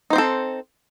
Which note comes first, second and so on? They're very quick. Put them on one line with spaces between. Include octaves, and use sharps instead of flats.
D#4 C5 C4 A4